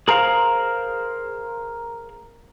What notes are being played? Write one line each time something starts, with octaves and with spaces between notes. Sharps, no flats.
G#4 A#4 C5 F5